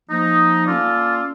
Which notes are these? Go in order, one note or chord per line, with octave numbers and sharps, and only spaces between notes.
F3 A#3 D#4
A#3 C#4 F4 A4 D5